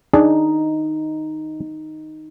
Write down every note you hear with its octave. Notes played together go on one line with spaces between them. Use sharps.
D4 D#4 G#4 D5